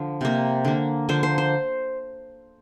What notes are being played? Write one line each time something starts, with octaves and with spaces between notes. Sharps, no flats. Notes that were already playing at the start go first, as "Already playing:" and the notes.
Already playing: D3 F3
C3 A#3
D3 A#3
D3 F3 A#3 C5
C5
C5